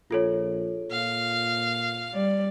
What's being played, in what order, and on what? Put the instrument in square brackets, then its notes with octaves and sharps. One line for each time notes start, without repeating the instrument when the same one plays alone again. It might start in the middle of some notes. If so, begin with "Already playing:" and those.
[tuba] A#1 [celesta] F4 A4 C#5
[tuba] A#2 [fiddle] F5
[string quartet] G3 D5